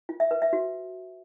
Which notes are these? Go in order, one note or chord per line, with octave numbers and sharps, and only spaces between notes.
F4
E5
B4
E5
F#4